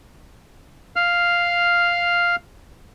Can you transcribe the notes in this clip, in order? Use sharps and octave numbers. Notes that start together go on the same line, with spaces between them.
F5 F6